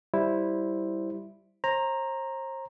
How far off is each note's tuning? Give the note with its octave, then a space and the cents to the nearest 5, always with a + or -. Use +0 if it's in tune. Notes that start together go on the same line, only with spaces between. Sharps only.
G3 +0 E4 +0 C5 +5
C5 +35 A#5 +0